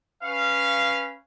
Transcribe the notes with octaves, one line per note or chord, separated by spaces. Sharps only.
C#4 B4 F5